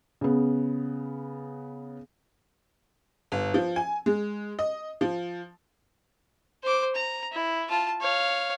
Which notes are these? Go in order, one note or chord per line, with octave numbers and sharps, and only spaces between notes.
C#3 B3
G1
F3
G#5
G#3
D#5
F3
C5 D6
A#5
E4
F4 A5
C#5 F5